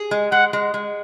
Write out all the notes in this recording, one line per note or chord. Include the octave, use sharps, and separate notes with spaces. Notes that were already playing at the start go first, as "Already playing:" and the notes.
Already playing: G#4
G#3
G#3 F#5
G#3
G#3